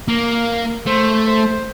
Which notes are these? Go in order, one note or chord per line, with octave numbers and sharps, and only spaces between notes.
A#3 A#4
A3 C5
C5